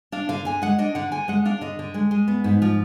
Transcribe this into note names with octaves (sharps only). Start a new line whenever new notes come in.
D4 F5
D3 F5
D3 G#5
G#3 F#5
D4 D#5
D3 F#5
D3 G#5
G#3 F#5
D4 F5
D3 D#5
D3
G#3
G#3
B3
G#2
F3